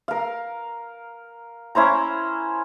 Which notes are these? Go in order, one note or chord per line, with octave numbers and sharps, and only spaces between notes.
A#4 F5
C#4 E4 C5 A#5